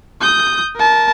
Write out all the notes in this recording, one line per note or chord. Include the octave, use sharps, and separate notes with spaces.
D#6 G6
A#4 A5